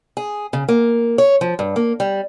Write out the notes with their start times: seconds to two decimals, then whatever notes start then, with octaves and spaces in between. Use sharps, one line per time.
0.17 G#4
0.53 C#3
0.68 A#3
1.18 C#5
1.41 F3
1.59 G2
1.76 A#3
2.00 G3